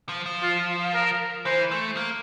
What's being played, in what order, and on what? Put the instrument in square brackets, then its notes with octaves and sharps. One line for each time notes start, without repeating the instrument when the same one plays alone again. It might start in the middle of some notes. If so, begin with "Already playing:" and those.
[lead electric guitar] F3
F3
[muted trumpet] F4
A#4
[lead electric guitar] E3 [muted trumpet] C5
[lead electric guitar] A3
A#3